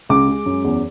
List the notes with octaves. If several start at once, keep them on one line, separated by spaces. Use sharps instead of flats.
C#2 D6
G#3
F#2
E2